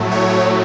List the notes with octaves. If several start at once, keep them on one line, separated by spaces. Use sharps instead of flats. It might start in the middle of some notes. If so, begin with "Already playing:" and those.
Already playing: A2 F#3 A3
C#5